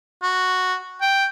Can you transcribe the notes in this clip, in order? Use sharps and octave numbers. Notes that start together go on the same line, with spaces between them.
F#4
G5